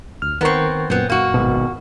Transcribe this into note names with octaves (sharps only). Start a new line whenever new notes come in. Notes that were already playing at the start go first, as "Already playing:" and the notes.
D2 F6
D#3 B3 C4 A#4 C#6
F#2 A#2 B3 C4
A#3 F#4
G#1 B2